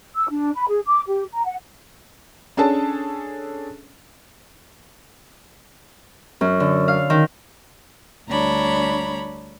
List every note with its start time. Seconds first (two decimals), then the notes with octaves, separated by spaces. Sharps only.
0.15 E6
0.30 D4
0.55 B5
0.68 G#4
0.86 D6
1.07 G4
1.32 A#5
1.46 F#5
2.57 C#4 D4 G#4 A4 A5
6.41 F#2
6.60 D3
6.88 F5
7.10 D#3
8.29 D2 G3 D4 C#5 A#5 B5